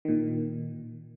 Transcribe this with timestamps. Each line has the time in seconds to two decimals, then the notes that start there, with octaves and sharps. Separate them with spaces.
0.05 A#2 D#3